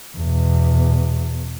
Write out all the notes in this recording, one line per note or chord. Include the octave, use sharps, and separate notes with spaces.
E2 B2